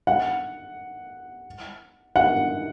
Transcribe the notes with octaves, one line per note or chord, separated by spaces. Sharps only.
F#5
F#5